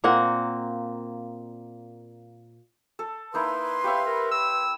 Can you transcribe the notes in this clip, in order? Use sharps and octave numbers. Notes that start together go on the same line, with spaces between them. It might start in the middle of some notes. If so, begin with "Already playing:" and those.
A#2 A#3 C4 F#5
A4
A#3 D#4 E4 B4 C6
G4 C#5 E5 F5
A#4
E6